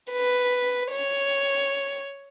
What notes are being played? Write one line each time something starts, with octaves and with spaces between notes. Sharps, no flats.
B4
C#5